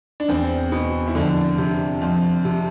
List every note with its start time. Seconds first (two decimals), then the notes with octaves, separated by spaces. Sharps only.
0.20 D4
0.28 E2 C4
0.72 B2
1.08 E4
1.15 F2 D3 D4
1.58 C3
2.02 F2
2.45 C3